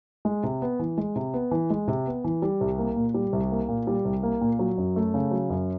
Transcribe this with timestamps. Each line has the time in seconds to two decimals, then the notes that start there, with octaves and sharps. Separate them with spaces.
0.25 G#3
0.43 C3
0.62 B3
0.79 E3
0.98 G#3
1.16 C3
1.34 B3
1.51 E3
1.70 G#3
1.88 C3
2.07 B3
2.24 E3
2.42 G3
2.61 C2
2.78 A#3
2.96 A#2
3.14 G3
3.33 C2
3.51 A#3
3.68 A#2
3.87 G3
4.05 C2
4.23 A#3
4.41 A#2
4.59 F#3
4.78 F#2
4.96 A3
5.14 C#3
5.31 F#3
5.50 F#2